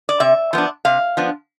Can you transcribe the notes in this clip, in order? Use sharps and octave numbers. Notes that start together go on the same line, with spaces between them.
D5
C3 E5
F3 B3 D4
C3 F5
F3 B3 D4